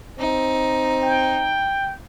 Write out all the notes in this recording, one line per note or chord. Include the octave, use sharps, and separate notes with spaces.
C4 D#4
G5